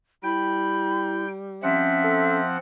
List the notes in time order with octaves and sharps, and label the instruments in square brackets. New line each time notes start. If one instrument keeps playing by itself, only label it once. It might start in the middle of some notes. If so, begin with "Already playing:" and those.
[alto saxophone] G3 [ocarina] E4 [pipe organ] G5 [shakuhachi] B5
[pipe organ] F3 C4 F#5 [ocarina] C#4 [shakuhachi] E5
[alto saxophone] A4